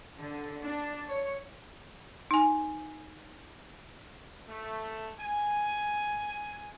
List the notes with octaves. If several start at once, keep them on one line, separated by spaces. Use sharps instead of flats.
D3
D4
C#5
D#4 G#5
A3
G#5